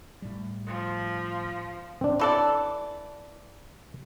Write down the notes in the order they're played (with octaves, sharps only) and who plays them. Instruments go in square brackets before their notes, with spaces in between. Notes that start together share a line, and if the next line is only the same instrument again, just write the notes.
[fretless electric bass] A2 G3
[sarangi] F3
[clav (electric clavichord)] C4 D4
[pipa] E3 A4 D5